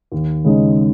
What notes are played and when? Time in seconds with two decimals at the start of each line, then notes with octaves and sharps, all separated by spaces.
0.12 D#2
0.44 C#3 G#3 D#4